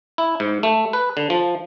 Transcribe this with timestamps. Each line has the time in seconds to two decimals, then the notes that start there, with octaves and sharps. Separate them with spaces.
0.18 E4
0.40 G#2
0.63 A3
0.93 B4
1.17 D3
1.30 F3